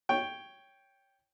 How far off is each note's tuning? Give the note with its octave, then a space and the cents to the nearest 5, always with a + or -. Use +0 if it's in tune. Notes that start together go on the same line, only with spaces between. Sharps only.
C#5 +0 G5 +0